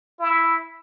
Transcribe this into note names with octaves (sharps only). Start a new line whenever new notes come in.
E4